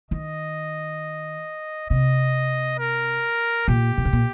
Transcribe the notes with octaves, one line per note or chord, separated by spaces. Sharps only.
D#3 D#5
C3 D#5
A#4
A#2 G4
A#2
C3
A#2